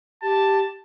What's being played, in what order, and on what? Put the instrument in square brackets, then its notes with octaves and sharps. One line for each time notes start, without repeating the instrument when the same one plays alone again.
[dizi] G4 [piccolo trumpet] A5